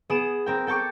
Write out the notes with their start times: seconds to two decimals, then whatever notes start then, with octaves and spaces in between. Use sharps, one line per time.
0.10 B3 G#4 D#6 D7 E7
0.46 C4 A#4 G5
0.67 A4 G5 A5 C#6 D6